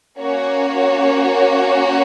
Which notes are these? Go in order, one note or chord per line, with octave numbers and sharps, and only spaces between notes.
A#3 C#4 F#4 C#5